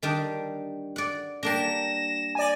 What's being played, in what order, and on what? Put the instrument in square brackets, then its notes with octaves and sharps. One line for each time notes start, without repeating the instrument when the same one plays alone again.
[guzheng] D#3 G3 D4
D5 F#5
[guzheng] G3 A#3 D4 [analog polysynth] A#6 E7
[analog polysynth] D5 G#5